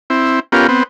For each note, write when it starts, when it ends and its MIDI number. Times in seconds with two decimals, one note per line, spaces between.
0.10 0.40 60
0.10 0.40 64
0.52 0.67 59
0.52 0.67 61
0.52 0.67 65
0.52 0.67 67
0.52 0.67 70
0.68 0.83 59
0.68 0.83 60